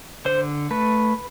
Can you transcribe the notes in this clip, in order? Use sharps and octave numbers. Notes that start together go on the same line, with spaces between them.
D3 C5
A3 B4